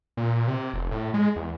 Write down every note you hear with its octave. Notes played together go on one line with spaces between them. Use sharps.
A#2
C3
F1
A2
G#3
E2